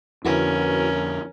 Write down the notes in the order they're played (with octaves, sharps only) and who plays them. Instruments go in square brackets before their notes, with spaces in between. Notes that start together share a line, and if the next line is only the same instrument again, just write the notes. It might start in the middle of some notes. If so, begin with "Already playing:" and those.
[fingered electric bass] F2 D3 [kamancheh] C#4 A#4 [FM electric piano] E4 F#4 B4